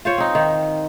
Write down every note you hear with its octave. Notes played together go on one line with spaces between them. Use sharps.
F4 C5 C#5
C4 D#4
D#3